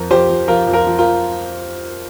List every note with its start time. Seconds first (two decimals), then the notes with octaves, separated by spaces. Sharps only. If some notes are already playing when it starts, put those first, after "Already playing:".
Already playing: F2 F3 A#4
0.10 F3 G4 C5
0.30 F3
0.48 F3 F4 A#4
0.67 F2
0.73 F4 A#4
0.87 F3
0.98 F4 A#4